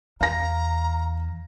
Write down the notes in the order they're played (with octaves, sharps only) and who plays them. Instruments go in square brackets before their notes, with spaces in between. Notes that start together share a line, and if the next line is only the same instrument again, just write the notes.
[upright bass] E2 [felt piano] F5 A#6 [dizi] A#5